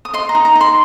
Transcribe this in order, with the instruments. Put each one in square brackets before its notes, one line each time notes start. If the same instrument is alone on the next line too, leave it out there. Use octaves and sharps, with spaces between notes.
[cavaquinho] D#6
D#5 C6
A#5
D#4
A#5
D#4
C6